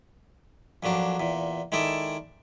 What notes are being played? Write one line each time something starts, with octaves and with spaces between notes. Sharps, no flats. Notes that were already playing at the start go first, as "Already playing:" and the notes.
F2 A#2 F#3 D4
E2 A#2
D#3 G#3 E4 A4 D5